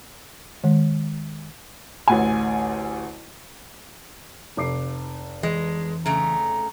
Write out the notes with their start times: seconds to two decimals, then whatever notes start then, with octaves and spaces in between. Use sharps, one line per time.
0.64 D#3 G#3
2.08 A1 D2 G#5
4.57 F1 D6 C7
5.43 E3 G#3
6.06 C#3 A3 A#5